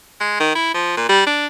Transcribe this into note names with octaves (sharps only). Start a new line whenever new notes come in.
G#3
D#3
E4
F3
A#2
G3
D4